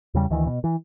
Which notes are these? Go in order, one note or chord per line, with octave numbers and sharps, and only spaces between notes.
E2 C#3 G3
D2 D#3 E3
B2
E3